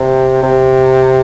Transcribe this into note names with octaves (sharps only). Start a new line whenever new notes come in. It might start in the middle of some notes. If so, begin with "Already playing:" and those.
Already playing: C3
C3